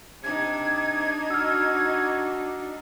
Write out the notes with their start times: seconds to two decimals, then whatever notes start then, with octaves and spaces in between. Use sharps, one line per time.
0.24 C3 D4 D#4 G#6
1.31 F#4 E6 F6